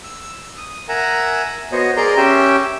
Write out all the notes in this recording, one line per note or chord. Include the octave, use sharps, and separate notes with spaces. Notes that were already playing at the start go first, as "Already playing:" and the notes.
E6
D#6
A#4 E5 F#5 G#5 A#5
B3 F#4 C5 C#5 D#5
G#4 A#4 D5 A#5 C6
C#4 G4 E5 G5